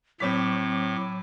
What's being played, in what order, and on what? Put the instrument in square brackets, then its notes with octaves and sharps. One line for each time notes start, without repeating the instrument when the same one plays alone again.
[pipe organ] A2 [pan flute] F#3 [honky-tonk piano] C4 C#5 B6 [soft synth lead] D6